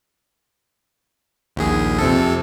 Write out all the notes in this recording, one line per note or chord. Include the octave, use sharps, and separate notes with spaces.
A#1 D#2 G#4
F2 C3 A4